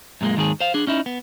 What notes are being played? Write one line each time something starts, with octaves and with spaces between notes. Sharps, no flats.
F#2 A#2 F#3 G#3 A#3
D#2 G#2 D#3 G#3 G#4
C5 F5
D4 G#4
C#4 D#4 E4
B3